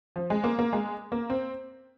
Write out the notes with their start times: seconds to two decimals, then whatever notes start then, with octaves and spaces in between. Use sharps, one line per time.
0.16 F3
0.30 G#3
0.44 A#3
0.59 A#3
0.73 G#3
1.12 A#3
1.30 C4